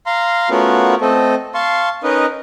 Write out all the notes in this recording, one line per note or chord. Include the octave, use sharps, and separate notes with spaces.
F5 A#5 C6
A3 B3 C#4 F4 F#4 A#4
A3 C4 A4 D#5
F5 A5 C6 C#6
C#4 D#4 A#4 B4 D#5